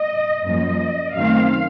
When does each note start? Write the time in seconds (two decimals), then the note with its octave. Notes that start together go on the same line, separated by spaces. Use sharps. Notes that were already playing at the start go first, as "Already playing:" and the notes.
Already playing: D#5
0.46 F#2 F3 A#3 D#5
1.15 F#2 D#3 A3 C4 F5